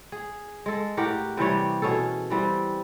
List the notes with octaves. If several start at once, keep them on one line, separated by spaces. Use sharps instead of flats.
G#4
G#3 A4
A2 G4 A#4 F#5
C3 E3 G3 C#5
B2 C#4 G#4 A4
E3 G3 C4